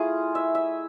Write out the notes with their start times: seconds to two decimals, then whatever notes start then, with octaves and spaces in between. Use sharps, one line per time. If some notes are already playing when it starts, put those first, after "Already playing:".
Already playing: A3 E4 F4 G#4
0.35 E5
0.55 E5